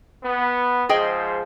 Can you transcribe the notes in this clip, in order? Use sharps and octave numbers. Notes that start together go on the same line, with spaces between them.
B3
G#2 F3 G#4 C5 D#5 G5